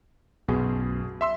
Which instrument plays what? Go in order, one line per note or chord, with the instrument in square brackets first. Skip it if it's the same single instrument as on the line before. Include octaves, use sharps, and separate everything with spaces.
[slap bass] B1 F#2 [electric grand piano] B2 G#4
[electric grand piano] E5 C6 E6